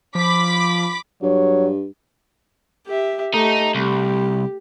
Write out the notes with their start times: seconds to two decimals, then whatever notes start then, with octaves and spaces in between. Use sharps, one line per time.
0.15 F3 B5 D6 B6
1.22 G2 F#3 C#5
2.87 G4 E5
3.34 A3 D#4 G4
3.75 C2 G4